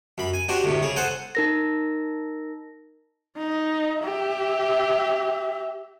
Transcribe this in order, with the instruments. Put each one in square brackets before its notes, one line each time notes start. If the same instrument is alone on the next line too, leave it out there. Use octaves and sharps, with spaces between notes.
[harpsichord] F#2 B5
G#5
D4 F#4 G4 C5
D2 A2 C3
C#3 G#4
A4 C5 F#5 G#5
[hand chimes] D#4 A#4 A#6
[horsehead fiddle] D#4
G4 E5